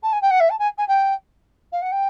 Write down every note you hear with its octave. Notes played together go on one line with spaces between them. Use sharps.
A5
G#5
G5
F#5
E5
A5
G#5
G#5
G5
F5
F#5
G5